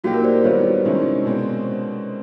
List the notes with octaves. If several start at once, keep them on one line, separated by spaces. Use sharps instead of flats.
A#2 F#3 A#3 D#4 F#4 G4
A#4
C5 D5
D#3 G3 B3 E4 C#5
C3 D#3 G#3 C#4 E4
B2 G#3 C4